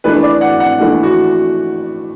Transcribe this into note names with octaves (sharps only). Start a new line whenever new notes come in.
E3 A3 D4 B4
D5
F#5
F#5
E3 A3 D4
F#4